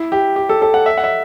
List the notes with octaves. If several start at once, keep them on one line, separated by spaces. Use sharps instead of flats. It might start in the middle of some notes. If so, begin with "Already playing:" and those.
Already playing: E4
G4
G4
A4
A4
F#5
E5
F#5
E5